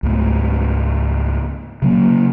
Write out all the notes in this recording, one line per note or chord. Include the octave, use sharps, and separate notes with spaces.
C#2 G#2 A3
C#3 F#3 A#3